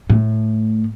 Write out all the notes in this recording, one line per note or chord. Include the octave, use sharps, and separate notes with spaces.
A2